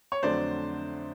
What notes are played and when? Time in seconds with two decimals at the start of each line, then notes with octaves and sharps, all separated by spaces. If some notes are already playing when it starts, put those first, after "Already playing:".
0.12 C#5
0.23 F2 D3 F#3 A3 C5 D5